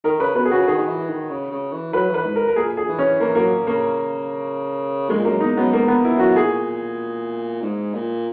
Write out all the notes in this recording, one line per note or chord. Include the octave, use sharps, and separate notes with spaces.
D#3 A#4
C#3 B4
B2 B4
G#4
C#3 F#4
D#3 G#4
D#3
E3
D#3
C#3
C#3
E3
F#3 B4
E3
B4
G#2
A#4
A#4
A#2 G#4
G#4
E3
C#4
E3 A#3
F#3 A#3
C#3 A#3
A#2 G#3
F#2 A#3
E2 D#4
F#2 B3
G#2 A#3
B3
E4
F#2 F#4
A#2 G#4
G#2
A#2